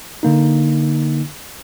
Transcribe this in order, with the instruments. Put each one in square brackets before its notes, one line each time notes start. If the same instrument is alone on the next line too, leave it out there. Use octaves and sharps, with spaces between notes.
[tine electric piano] D3 A#3 D#4